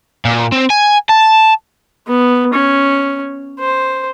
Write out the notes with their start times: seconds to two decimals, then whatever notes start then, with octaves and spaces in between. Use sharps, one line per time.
0.25 A#2
0.52 C4
0.70 G#5
1.09 A5
2.07 B3
2.53 C#4
3.59 C5